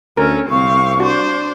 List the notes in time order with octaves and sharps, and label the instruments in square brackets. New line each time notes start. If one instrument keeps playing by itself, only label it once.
[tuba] D2 [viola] C#4 A4 [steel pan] A#4
[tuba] C2 [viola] C4 F5 [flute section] C#6
[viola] D4 C5 [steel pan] F#4